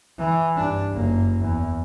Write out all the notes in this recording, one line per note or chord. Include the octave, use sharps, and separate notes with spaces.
E3
G2 D4
F#1 A#3
E2